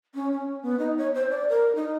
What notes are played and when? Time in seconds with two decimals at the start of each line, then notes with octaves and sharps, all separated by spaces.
0.15 C#4
0.32 C#4
0.62 B3
0.79 D#4
0.98 C#5
1.15 C5
1.30 D5
1.49 A#4
1.75 D#4